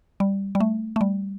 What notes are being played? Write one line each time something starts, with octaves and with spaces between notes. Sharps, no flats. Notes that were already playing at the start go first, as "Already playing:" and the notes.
G3
G3
A3
A3
G3